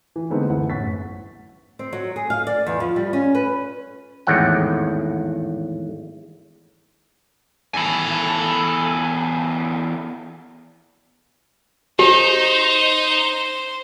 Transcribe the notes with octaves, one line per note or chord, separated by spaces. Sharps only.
E3
D3 G#3 A3 B3 C4 D#4
F#1 D2 E3 A3 B4 F#5
A1 F#2 F#5 C#6 A6 B6
C4
F#3
G#4
F5
D5
E2
F3
G3
C#4
B4
G#1 E2 A2 F#5 G5
E2 A4 G#5 B5
D#4 G4 C5